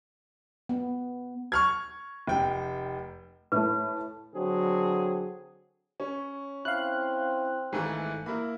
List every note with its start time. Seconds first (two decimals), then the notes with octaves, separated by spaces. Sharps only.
0.69 B3
1.52 C#6 F6 G#6
2.27 F1 G5
3.52 A2 A3 B4
4.34 D3 F#3 C4 G#4
6.00 C#4 C#5
6.65 C4 E4 F5 F#6
7.73 G#1 G#2 E3 A3 G#5
8.26 A#3 E4 A#4 B5